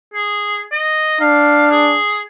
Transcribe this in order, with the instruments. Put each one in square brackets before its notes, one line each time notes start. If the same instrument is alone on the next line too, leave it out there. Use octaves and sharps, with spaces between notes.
[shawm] G#4
D#5
[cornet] D4 [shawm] F5
[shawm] G#4